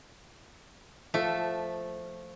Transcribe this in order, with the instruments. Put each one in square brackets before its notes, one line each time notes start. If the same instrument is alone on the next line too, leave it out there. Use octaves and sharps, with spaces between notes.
[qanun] F3 [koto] A3